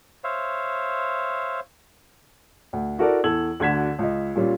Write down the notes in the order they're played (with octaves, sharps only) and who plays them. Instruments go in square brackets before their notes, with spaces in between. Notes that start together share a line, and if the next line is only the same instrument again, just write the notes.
[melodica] C5 C#5 E5 F5
[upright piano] D2
E4 F#4 A4 A#4 D5
E2 A4 E6 G#6 F#7
D2 D3 F#4 G#6 B6 E7
C#2 D#5
A#2 G3 C#4 F4